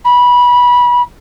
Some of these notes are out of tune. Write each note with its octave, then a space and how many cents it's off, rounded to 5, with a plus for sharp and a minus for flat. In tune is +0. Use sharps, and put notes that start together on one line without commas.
B5 -20